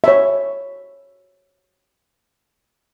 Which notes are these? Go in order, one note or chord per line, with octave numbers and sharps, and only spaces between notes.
C#5 E5